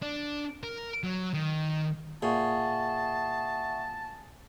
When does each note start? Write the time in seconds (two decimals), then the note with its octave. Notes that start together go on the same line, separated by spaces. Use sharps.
0.02 D4
0.63 A#4
1.03 F#3
1.33 D#3
2.23 A#2 G#4 E5 F#5 A5 C#6